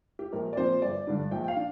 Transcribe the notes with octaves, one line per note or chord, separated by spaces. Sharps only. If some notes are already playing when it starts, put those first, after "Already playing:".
G4
A#1 A#4
D5
A#2 F3 C4 C5
G1 D5
G2 D3 G3 D4
A#1 G5
G5
F5
D4